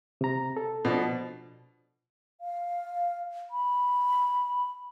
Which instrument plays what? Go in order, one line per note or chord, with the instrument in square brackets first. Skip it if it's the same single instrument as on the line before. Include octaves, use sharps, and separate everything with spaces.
[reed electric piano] C3 A#5
A4
[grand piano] B2 F3 D4
[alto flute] F5
B5